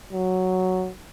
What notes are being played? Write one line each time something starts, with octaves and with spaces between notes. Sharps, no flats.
F#3